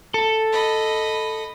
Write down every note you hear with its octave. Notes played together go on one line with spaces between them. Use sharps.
A4
D#5 B5